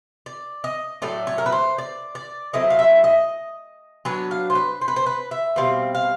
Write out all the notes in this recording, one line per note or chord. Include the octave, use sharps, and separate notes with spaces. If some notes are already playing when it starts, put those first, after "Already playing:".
D5
D#5
A2 F#3 A3 D5
C#5
A#4
B4
C5
D5
D5
F#3 A3 C4 E4 D#5
F5
E5
D#5
F#3 B3 D4 C#5
F5
C5
B4
C5
B4
C5
B4
E5
B2 G3 C4 F5
F5